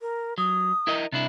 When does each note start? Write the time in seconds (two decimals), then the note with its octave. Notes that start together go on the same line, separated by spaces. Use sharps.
0.01 A#4
0.38 F#3 D#6
0.87 E4 A#4 D#5
1.12 C3 D4 E4